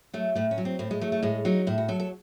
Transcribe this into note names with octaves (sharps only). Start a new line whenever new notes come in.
F#3 A3
A2 A3
C#4
F#3
C4
A2 C4
G#3
F#3 A3
A3
A2 G#3
F#3 D#4
A2 E4
F#4
F#3 A4
A4